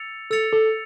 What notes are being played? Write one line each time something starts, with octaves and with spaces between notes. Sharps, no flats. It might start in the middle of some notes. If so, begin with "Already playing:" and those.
Already playing: E6 A6 C#7 F7
A4 E6 A6 C#7 F7
A4